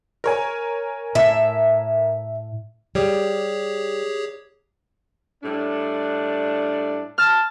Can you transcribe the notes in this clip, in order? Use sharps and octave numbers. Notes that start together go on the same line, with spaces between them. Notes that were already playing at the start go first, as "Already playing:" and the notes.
A#4 C#5 G#5
A2 E5
G3 G4 G#4 C#5
A2 G3 D4
A5 F6